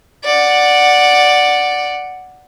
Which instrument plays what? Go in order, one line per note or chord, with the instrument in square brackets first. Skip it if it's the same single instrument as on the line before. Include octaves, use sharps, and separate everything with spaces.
[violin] D5 F#5